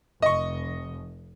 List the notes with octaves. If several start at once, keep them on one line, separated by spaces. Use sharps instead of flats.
F1 D#5 C#6